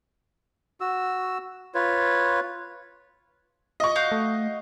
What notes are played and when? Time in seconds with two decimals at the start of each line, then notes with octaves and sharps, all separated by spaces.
0.81 F#4 E6
1.75 F4 B4 C#5
3.80 D#5 C#6
3.96 F#4 F5 G6
4.12 A3